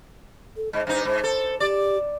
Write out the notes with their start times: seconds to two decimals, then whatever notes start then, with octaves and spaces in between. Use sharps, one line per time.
0.57 A4
0.73 G#2 D#5
0.87 G2 D#4 C5
1.05 G#2 C5
1.24 A4
1.60 G4 D5